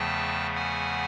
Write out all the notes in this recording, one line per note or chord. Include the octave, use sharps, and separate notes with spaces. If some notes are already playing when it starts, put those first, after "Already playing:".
Already playing: E2 C#3 F3 A3 G5 A5
F#5 G#5